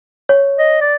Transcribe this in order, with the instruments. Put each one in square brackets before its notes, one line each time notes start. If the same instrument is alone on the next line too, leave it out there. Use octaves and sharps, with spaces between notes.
[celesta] C#5
[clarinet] D#5
D5